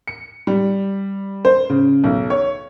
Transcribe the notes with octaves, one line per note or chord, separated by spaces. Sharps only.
C#7
G3
C5
C#3
B1
C#5